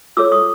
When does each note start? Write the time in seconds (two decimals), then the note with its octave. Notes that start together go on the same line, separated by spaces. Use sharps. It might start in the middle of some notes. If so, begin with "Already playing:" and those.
0.17 F4 A4 C#5 D6 E6
0.32 C#6 D#6